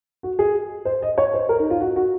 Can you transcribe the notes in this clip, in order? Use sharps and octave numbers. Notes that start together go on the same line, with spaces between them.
F#4
G#4
C5
D#5
C#5
C5
A#4
D#4
F4
F#4
F#4